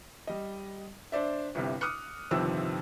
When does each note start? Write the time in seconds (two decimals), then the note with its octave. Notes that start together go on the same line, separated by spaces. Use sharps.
0.27 G3 D#5
1.12 D4 C5 D5 E5
1.55 G1 C2 C3
1.81 D6 D#6 F6 F#6 C#7
2.31 G1 F2 C3 D#3 C4 E6